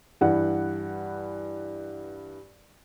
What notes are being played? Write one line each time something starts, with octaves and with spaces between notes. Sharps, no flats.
G2 E3 F#5